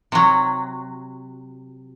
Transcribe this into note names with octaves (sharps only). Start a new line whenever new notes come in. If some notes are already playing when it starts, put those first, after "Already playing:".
C3 F#3